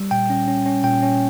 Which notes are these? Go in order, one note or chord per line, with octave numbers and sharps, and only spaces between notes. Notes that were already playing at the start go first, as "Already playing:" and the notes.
Already playing: G3
A#2 G5
C#4
C#4
C#4
A#2 G5
C#4